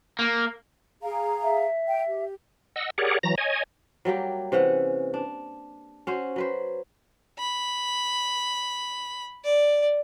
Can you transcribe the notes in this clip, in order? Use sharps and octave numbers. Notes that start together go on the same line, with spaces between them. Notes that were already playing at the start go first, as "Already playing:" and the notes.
A#3
G#4 F5 A#5
E5
G5
G4
D#5 F#5 E6
G4 G#4 A#4 C#5 D5 F#5
E3 F#3 A#5 A#6
C#5 D#5 G#5
F#3 G3 A#3 G4
C3 E3 C#4 F#5
D4
C#4 F#4 C5
F#3 B4 C5
B5
D5